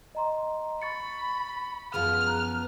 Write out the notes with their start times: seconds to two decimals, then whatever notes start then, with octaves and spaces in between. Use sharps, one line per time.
0.15 D#5 A#5 C6
0.82 B5 C#6 A6 C#7
1.94 F#2 F3 B3 G#4 F5 F6
2.27 A#5 F#6